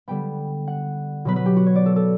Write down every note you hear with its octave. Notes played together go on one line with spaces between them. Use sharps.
D3 G3 B3 G5
F#5
B2 F#3 B3 B4
B4
G4
F#4
C#5
D5
A4
A4